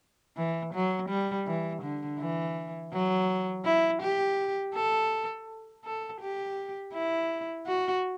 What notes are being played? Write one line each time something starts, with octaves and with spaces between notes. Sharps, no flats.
E3
F#3
G3
E3
D3
E3
F#3
E4
G4
A4
A4
G4
E4
F#4